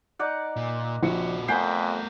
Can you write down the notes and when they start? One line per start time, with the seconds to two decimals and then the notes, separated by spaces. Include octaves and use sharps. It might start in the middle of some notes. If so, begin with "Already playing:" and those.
0.19 D#4 D5 F#5
0.56 A#2
1.03 A#1 A#2 F#4 C#7
1.48 F2 A3 B3 A#4 B4 G5 G#5 C7